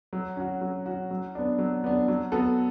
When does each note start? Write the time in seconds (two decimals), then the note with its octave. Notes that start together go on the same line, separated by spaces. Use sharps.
0.13 F#3
0.37 C#4 F#4
0.61 F#3
0.86 C#4 F#4
1.11 F#3
1.35 B3 D4
1.59 F#3
1.84 B3 D4
2.08 F#3
2.32 B3 F#4 A4